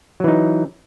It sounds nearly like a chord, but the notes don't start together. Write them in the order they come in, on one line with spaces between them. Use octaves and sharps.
F#3 E3 D#4